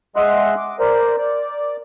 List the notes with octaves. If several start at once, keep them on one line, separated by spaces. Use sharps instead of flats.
G#3 D#5 E5 F#5 C6 F#6
D6
A#4 C5 D5
D5